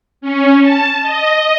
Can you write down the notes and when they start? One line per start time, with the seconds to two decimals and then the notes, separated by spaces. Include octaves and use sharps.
0.21 C#4
0.61 A5
1.02 D#5